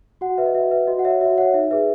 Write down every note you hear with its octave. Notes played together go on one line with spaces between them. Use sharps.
F#4 F#5
B4 E5
D#5
F#4 E5
B4 E5
F#4 D#5
F#5
C#5 E5
F#4 E5
C#5 F#5
D#4 E5
G#4 B4 E5